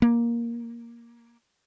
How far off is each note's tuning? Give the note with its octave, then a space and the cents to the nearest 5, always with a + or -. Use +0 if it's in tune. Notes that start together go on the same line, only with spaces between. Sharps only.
A#3 +10